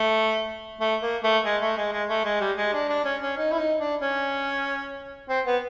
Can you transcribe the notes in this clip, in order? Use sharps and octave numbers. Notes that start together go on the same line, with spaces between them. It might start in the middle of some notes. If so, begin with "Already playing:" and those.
Already playing: A3
A3
A#3
A3
G#3
A3
G#3
G#3
A3
G#3
G3
G#3
D4
D4
C#4
C#4
D#4
E4
D#4
D4
C#4
C4
B3